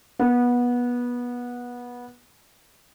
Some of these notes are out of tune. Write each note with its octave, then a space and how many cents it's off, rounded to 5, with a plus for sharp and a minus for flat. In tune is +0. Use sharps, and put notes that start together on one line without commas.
B3 -20